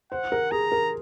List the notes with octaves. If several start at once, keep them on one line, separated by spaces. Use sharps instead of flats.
C5 F#5
A#4
G#4 A#5
A#4